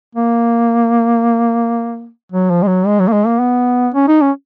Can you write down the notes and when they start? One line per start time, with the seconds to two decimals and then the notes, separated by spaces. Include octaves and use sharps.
0.15 A#3
2.32 F#3
2.50 F3
2.62 G#3
2.67 F#3
2.86 G#3
3.00 F#3
3.08 A#3
3.13 G#3
3.26 A#3
3.40 B3
3.94 C#4
4.08 D#4
4.21 C#4